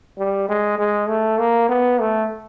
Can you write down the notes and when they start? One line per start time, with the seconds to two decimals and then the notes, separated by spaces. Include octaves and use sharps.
0.18 G3
0.49 G#3
0.79 G#3
1.08 A3
1.39 A#3
1.69 B3
1.99 A3